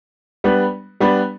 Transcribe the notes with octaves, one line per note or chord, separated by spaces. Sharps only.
G3 B3 D4 B4
G3 B3 D4 B4